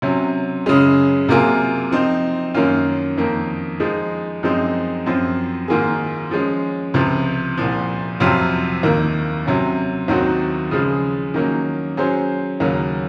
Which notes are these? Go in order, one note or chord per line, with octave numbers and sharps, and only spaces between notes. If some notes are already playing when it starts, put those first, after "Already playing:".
C3 F#3 C#4
F#2 C#3 G#3 C#4
C3 F#3 A#3 F4 G#4
F3 C4 D#4
F#2 D#3 A#3 C#4 F4
F2 D#3 A#3
F3 G#3 D#4
F#2 F3 G#3 C4 D#4
F#2 F3 C4 F4
G#2 D#3 A#3 F4 G#4
F3 G#3 C#4
C#2 C3 F3
C2 A#2 F3
F2 C3 F#3 C4 F4
D#2 D#3 A#3
C3 F#3 C#4
D#2 D#3 F#3 C4 F#4
C#3 F3 G#3
D#3 F#3 A#3 C#4
F#3 C#4 G#4 C5
D#2 C#3 F#3 A#3 C#4